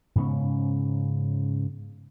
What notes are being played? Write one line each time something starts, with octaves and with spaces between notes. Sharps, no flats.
G#2 C#3 B3 C#4